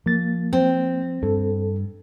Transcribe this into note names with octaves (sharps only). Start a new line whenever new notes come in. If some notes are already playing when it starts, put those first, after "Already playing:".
F3 A#3 A6
C4
G2 A4